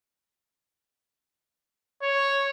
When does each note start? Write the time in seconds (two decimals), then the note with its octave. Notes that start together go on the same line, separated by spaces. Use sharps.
2.02 C#5